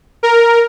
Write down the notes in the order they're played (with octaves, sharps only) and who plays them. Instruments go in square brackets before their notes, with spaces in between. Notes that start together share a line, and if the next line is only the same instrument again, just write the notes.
[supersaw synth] A#4